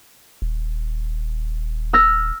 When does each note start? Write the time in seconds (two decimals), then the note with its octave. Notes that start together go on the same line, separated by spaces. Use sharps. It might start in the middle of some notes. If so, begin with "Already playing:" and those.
0.42 D#1
1.93 E6 F6 A#6